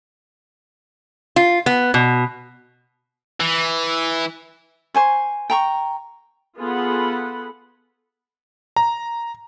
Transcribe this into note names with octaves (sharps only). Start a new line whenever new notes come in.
F4
B3
B2
E3
C5 G#5 C#6
G5 A#5 C#6
B3 F4 G#4 A4 F#5 B5
A#5